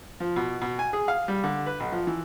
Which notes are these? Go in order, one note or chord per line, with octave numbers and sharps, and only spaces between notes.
F3
B2
B2
G#5
G#4
F5
G3
D3
B4
B1
F3
E3